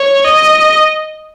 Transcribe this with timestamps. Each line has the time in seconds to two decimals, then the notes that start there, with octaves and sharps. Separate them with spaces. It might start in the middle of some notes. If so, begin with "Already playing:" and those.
Already playing: C#5
0.25 D#5